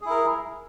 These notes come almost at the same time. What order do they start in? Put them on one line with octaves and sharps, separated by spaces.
G#4 E4 A#4